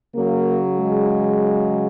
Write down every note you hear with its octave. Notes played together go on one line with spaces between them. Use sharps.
C#3 F#3 A#3
G#3